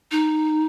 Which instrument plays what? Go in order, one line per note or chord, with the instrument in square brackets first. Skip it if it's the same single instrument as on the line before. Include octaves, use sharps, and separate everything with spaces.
[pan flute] D#4